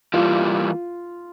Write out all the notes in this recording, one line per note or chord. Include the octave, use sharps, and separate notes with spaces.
E3 G3 A#3 F4